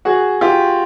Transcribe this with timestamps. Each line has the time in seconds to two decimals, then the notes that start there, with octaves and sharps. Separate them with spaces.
0.05 F#4 G#4
0.41 F4 G4